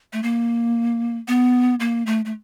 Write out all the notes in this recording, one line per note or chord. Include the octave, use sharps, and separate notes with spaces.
A3
A#3
B3
A#3
A3
A3